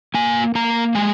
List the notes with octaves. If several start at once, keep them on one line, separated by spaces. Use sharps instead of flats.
A#3 G#5
A#3 A#5
G#3 G#5